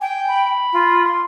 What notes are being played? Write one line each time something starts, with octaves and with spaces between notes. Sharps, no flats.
G5 G#5
B5
F4
C6